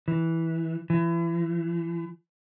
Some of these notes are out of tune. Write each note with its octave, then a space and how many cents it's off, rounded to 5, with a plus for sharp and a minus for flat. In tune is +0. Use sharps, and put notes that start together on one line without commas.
E3 -10
E3 +35